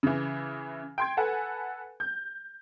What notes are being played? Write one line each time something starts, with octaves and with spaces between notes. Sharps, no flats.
C#3 E3
G5 C6 G#6
A4 B4 F#5 G#5
G6